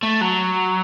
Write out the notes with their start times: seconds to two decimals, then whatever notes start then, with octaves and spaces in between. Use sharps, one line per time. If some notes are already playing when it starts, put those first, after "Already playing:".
0.03 A3
0.21 F#3